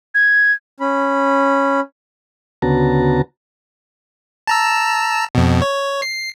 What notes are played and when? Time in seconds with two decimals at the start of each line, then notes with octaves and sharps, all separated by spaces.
0.15 G#6
0.80 C#4 B5
2.62 D2 C#3 B3 F#4 A5 A#5
4.47 A5 A#5 E6
5.35 F2 B2
5.62 C#5
6.02 C7